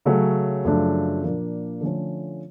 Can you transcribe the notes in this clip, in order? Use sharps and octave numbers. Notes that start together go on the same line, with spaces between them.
C#3 F#3 A3 C#4
F#2 C#3 F3 A3 D4
A#2 F3 A#3 D4
D3 F3 A3 C#4